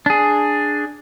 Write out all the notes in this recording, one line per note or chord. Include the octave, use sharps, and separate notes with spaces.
D4 G#4